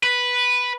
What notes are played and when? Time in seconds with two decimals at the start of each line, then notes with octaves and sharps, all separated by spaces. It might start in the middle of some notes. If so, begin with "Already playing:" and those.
0.04 B4